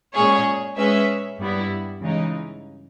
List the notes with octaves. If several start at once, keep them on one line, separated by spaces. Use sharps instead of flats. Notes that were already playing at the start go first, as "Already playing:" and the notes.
A#2 G#3 C#4 G#4 C#5
G#3 C#4 G#4 B4 E5
G2 G3 B3 E4
C#3 E3 G#3 D#4